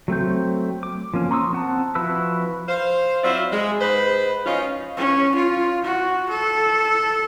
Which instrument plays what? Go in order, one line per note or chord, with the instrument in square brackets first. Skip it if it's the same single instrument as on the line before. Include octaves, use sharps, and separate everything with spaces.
[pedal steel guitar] F#3 A3 C4 G6
D6
F3 A#3 C#4
A#5 C6 C#6 D#6 E6
C4 F#5 A5
F3 E4 F#4 B4 E6
[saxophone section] C5 F5
F#3 C4 E4 F4 D5 E5
G#3
G#2 B4 C5
C#4 D#4 F4
[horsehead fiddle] C#4
F4
F#4
A4